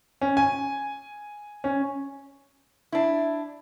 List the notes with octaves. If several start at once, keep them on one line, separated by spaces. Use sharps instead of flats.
C#4
G#5
C#4
D4 E4